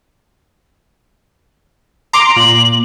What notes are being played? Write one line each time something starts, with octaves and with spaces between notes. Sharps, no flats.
A#5 C6 D6 F7
A#2 F#7